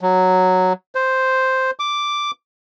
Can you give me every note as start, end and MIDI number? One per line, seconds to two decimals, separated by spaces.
0.01 0.73 54
0.95 1.71 72
1.80 2.31 86